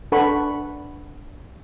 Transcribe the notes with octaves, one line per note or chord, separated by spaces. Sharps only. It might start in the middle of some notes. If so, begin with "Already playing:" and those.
D4 A4 B4 F#5 B5 C#6